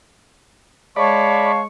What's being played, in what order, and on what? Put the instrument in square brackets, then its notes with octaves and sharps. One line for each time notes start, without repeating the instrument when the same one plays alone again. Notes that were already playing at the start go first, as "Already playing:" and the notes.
[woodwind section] G#3 C#6 [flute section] C#5 F5 A5 [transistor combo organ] D5 B5